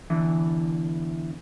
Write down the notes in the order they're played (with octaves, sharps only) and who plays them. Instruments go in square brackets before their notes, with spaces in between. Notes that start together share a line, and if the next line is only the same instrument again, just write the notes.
[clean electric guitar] E2 D3 E3